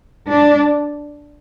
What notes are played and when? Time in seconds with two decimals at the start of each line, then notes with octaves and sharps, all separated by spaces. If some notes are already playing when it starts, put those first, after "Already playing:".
0.27 D4